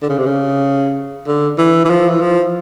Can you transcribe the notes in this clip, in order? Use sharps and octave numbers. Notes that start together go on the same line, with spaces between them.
D3
C#3
C3
C#3
D3
E3
E3
F3
E3
F3